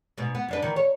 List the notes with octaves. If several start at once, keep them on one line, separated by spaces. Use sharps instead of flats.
G#2 B2
B3
F#2 D4 B4
D#3 E3
C#5